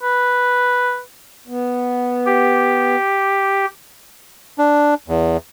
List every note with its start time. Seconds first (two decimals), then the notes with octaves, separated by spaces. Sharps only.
0.03 B4
1.48 B3
2.26 G4
4.58 D4
5.08 E2